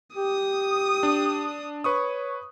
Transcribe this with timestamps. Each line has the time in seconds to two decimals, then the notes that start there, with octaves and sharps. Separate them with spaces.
0.16 G4 D#6
1.03 D4
1.84 B4 C#5 C#6 D#6